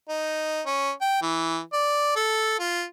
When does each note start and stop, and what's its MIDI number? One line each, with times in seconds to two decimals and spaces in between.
0.09 0.61 63
0.66 0.90 61
1.01 1.20 79
1.22 1.59 52
1.73 2.13 74
2.16 2.57 69
2.60 2.84 65